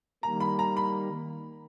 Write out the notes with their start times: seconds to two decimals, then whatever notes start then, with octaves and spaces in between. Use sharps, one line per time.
0.23 D#3 G3 A#3 A#5
0.40 B5
0.59 A#5
0.77 B5